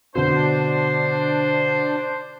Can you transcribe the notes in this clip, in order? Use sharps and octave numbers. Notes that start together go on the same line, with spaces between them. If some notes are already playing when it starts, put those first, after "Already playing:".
B2 D3 D4 C5